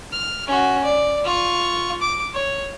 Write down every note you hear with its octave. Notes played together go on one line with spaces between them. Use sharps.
F6
C#4 F#4
D5
F4 C#6
D6
C#5